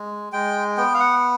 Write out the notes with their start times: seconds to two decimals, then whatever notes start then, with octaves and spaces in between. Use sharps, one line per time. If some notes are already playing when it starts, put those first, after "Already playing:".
Already playing: G#3
0.33 G#3 G5
0.77 B3 G5
0.94 F5
1.00 F#5